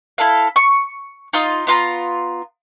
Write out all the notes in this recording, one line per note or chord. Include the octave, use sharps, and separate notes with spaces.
E4 A4 F5
C#6
D#4 F4 D#5
B3 F4 A#5